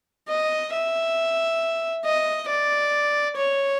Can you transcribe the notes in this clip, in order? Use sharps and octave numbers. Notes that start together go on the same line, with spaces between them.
D#5
E5
D#5
D5
C#5